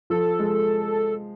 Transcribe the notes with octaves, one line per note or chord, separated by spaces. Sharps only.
F3 A4
G#3